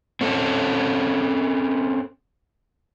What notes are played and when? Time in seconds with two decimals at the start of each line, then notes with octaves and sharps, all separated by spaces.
0.21 C4 C#4 A4